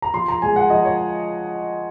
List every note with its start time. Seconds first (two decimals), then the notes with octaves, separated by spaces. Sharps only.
0.02 A#5
0.14 F3 C6
0.28 A#5
0.42 G#3 G#5
0.56 F#5
0.70 F3 D#5
0.85 C#5